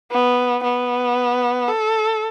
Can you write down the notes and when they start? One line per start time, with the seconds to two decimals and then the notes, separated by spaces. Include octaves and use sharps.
0.12 B3
0.64 B3
1.68 A4